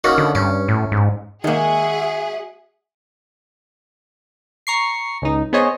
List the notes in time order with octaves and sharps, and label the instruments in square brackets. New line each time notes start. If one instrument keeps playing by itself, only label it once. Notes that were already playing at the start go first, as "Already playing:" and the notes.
[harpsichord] D#3 A#3 C#4 [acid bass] F#4
[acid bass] D3
[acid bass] G2 [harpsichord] C#4
[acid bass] A2
G#2
[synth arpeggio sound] D#3 A#3 [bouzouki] G#3 F#4 [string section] G#4 F#5 [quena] E5
[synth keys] A#5 C#6 C7
C#2 D#4
B3 G#4 C5 C#5 D#5